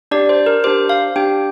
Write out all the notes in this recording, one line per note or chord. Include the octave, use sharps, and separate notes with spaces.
D4 G4 D5
C5
A#4
D4 G4 C5
F5
D4 G4 G5